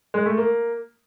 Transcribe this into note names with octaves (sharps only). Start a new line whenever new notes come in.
G#3
A3
A#3